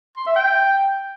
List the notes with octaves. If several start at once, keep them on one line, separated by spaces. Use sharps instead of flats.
C6
E5
G5